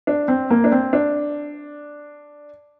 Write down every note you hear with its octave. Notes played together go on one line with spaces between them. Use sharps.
D4
C4
A#3
D4
C4
D4